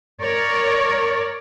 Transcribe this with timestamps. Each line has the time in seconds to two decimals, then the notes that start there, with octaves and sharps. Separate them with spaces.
0.21 A#4 C#5 D5